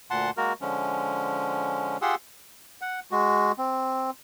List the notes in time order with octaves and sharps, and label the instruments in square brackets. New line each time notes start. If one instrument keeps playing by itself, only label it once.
[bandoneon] D2 A#2 F#5 A5 C6
G#3 A#3 F#4 A#4
D3 F3 G#3 C#4
F4 G4 G#4 F#5 C6 E6
[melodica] F#5
G#3 F#4
C4